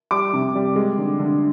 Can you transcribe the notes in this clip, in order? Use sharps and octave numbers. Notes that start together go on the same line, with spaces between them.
G3 D6 D7
C3
G3
G#3
D3
D3